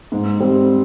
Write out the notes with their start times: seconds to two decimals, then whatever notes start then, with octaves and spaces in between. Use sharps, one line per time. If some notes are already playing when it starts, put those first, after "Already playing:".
0.12 G#2
0.40 G3 C4